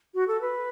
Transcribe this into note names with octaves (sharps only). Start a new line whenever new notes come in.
F#4
A4
B4